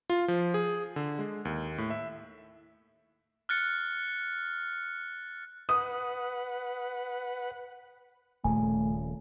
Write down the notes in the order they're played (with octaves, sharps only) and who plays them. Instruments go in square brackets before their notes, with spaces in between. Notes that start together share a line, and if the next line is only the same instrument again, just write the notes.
[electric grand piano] F4
F3
G#4
D3
G#3
D#2
A2
E5
[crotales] F6 F#6 A6 C#7
[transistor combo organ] B4 F#5 [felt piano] D#6
[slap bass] D#1 A#2 C#3 [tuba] A3 [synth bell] G#5